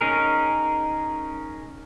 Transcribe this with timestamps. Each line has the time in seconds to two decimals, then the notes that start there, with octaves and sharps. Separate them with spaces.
0.01 C#4 D#4 G#4 A#4